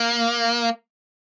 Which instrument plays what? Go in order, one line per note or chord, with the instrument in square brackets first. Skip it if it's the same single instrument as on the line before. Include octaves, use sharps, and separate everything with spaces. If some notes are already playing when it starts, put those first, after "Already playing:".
Already playing: [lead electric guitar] A#3